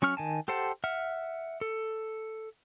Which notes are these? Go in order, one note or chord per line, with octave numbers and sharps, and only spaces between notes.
F#3 C#4 C#6 F6
D#3 G#5 A5
G4 A4 C5 F#5 A5
E5 F#5 F6
A4